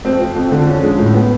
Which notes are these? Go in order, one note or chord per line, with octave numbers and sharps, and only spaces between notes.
F2 C4
F3
F2
D3
F3 C#4
G#3
A2
B3